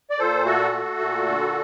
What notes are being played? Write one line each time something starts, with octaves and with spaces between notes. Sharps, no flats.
D5
A#2 A4 C5
A3 F#4 A4
A3
A#2
D3